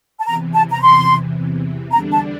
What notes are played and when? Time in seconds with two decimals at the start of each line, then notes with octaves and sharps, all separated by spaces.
0.20 A5
0.26 E2 C3 E3 A#5
0.54 A5
0.70 A#5
0.81 C6
1.91 E2 D3 G3 D4 A#5
2.13 A5